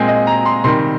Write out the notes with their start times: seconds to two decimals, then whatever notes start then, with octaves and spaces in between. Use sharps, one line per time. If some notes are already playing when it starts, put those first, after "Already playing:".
Already playing: A#2 G#3 C4 G#5
0.08 D#5
0.27 A#5
0.46 C6
0.64 C3 D#3 G3 C6